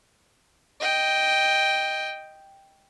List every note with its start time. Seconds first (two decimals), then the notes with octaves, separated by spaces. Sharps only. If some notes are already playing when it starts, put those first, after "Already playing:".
0.80 D#5 G5